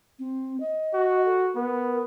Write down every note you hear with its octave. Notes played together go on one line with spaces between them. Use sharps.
C4
D#5
F#4
A4
B3 A#4